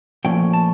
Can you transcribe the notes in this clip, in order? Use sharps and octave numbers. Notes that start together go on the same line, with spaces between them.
A#2 F3 A3 C#4 G5
A5